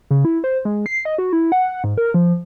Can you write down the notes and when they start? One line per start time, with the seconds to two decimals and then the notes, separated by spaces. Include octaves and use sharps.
0.11 C#3
0.25 E4
0.44 C5
0.65 G#3
0.86 C7
1.05 D#5
1.18 F#4
1.33 E4
1.52 F#5
1.84 G#2
1.98 A#4
2.14 F3